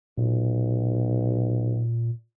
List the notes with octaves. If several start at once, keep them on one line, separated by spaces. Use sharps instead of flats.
B1 A#2